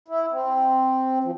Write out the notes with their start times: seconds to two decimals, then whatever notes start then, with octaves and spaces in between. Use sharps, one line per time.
0.08 E4
0.31 C4
1.24 F3